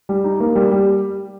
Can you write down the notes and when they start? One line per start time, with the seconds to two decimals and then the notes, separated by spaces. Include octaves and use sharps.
0.09 G3
0.24 D#4
0.40 A#3
0.56 G3
0.71 G3